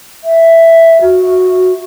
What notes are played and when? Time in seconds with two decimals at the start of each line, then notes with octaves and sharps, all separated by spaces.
0.24 E5
1.01 F#4